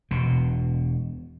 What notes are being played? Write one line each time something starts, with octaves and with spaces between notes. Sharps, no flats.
E1 B2